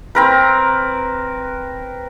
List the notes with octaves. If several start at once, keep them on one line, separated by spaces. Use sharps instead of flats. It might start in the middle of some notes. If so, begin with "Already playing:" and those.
C4 A#4 B4